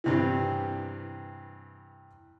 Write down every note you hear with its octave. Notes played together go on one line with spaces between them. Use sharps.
G2 C3 E3